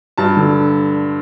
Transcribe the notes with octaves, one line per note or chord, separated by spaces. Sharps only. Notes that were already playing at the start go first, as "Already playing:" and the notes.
G2 A5
D3